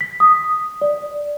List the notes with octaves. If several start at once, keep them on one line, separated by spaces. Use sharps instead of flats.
B6
D#6
D5